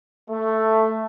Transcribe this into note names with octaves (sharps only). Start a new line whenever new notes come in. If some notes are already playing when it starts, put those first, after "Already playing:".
A3